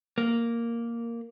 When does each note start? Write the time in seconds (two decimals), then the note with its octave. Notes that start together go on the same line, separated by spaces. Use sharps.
0.18 A#3